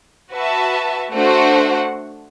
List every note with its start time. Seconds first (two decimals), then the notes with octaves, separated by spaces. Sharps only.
0.33 F#4 B4 E5 A5
1.12 A3 D4 F#4 C5 F#5